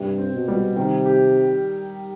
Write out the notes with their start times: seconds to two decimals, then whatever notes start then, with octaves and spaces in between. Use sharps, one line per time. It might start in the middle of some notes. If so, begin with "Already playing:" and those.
Already playing: G2 C3
0.18 C4
0.33 B2
0.48 G3
0.76 C3 D#3
1.06 G4